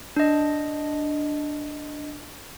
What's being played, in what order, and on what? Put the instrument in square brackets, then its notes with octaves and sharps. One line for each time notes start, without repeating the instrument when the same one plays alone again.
[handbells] D4 D#5